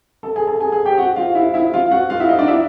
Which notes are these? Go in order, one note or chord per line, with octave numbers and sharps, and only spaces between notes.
A4 A5
G#4 G#5
A4 A5
G#4 G#5
G#4 G#5
G4 G5
F#4 F#5
F4 F5
E4 E5
E4 E5
F4 F5
F#4 F#5
F4 F5
E4 E5
D#4 D#5
D4 D5
E4 E5